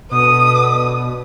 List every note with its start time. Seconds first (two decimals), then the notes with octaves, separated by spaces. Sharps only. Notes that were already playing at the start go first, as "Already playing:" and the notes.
0.11 B2 D4 A4 B4 D#6